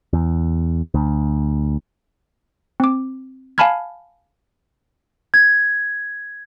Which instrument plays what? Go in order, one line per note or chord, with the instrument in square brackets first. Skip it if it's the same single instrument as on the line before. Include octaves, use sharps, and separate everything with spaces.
[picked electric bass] E2
D2
[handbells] C4 D6
F5 G#5 A5 B5 F6 G#6
[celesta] G#6